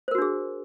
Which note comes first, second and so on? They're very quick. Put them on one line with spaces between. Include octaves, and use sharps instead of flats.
C5 A#4 F#4 D4 G#4